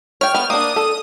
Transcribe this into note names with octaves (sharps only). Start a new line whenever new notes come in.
C#5 G5 F6
B3
A#3 D4 D#6
A4